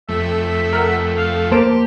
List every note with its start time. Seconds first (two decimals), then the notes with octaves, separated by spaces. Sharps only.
0.09 F2 A3 E5
0.73 A#4 F#5
1.17 F5
1.51 A#3 G4 C5 A5 D7